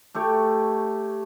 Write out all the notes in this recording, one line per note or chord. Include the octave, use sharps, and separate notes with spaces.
A3 G4 C#5